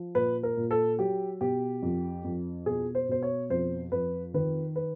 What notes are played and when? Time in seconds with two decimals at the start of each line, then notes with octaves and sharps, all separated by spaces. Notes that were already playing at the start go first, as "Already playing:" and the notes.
Already playing: F3
0.15 A#2 B4
0.43 A#4
0.57 A#2
0.71 A4
0.99 F#3 G4
1.41 B2 G4
1.82 F2
2.24 F2
2.66 B2 G#4
2.95 C5
3.09 B2 C5
3.23 C#5
3.50 F2 C5
3.92 F2 B4
4.34 D#3 B4
4.76 B4